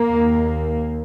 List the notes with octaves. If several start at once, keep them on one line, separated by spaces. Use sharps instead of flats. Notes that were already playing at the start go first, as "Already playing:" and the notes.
Already playing: A#3
D#2